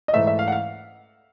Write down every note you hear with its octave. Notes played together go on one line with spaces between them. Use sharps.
D#5
G#2 E3 A3 E5
E5
F5
F#5
F5